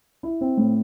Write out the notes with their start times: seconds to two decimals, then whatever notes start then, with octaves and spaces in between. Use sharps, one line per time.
0.23 E4
0.41 C4
0.57 A2